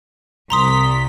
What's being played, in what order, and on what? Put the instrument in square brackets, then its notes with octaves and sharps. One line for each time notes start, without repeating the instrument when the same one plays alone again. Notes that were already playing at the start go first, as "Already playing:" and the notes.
[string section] C2 B6 [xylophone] A#5 C6 D#6